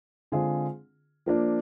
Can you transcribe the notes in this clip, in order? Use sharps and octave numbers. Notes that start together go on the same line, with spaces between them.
D3 G#3 C4 F4 G#4
F3 A#3 D4